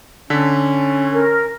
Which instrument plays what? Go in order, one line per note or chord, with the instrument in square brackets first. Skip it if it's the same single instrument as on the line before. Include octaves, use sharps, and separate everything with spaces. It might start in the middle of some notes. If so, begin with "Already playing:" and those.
[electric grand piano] D3 A4 B6 [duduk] C#4
[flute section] A#4